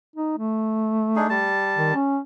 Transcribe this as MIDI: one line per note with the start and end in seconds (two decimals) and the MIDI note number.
0.16 0.37 63
0.38 1.51 57
1.16 1.27 62
1.16 1.27 63
1.16 1.27 68
1.30 1.94 55
1.30 1.94 81
1.77 1.91 51
1.94 2.19 61